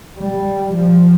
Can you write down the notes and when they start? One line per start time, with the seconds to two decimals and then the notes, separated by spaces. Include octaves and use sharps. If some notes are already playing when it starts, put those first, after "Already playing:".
0.19 G3
0.73 F3